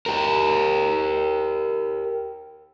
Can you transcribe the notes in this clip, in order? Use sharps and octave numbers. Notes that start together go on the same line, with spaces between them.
G4 A#4